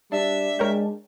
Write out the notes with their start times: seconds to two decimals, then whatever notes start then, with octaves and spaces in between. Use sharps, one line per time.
0.12 G3 D4 E5
0.59 G#3 A#4 C#5 G5